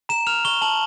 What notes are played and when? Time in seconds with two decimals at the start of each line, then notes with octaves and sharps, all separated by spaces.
0.09 A#5 E7
0.27 F6 F7
0.45 C#6 G7
0.62 A5 F#7